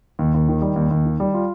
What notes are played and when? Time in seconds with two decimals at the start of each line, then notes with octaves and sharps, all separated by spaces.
0.19 D#2
0.34 D#2
0.49 D#3
0.62 G3
0.76 D#2
0.91 D#2
1.05 D#3
1.20 G3
1.34 F4